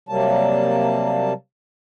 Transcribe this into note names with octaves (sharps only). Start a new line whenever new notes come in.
C3 F#3 G3 A#3 A5